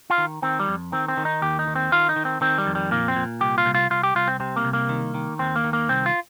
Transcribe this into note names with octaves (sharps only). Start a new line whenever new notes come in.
F4
D#3
D#3 C4
G3
F2
D#3 C4
C4
D#3
D#4
D#2 G4
D#4
D#3
C4
D#3 F4
D#4
D#3
C4
D#3 C4
G3
F2
G3
A#2 A#3
C4
A#2
C2 G4
F4
C2
F4
C2 F4
G4
C2 F4
C4
C3 C4
A#3
C2
A#3
D#3
D#3
D#2 C4
A#3
D#3
A#3
C2 C4
F4